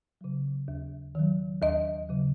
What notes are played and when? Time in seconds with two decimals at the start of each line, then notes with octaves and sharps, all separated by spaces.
0.21 C#3 F#3
0.68 D#2
1.15 D#3 F#3
1.62 D#2 D#5
2.09 C#3 F#3